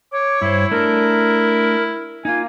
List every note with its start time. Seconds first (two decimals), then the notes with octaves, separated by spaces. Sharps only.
0.12 C#5 D6
0.42 G2 E4 C5
0.71 A3 D4 A#4
2.25 A#3 D#4 F4 G#5